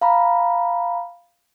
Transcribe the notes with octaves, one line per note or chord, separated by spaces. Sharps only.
F5 A#5 B5